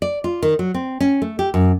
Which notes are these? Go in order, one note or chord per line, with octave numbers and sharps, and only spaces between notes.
D5
F4
D#3
F#3
C4
C#4
A3
G4
F#2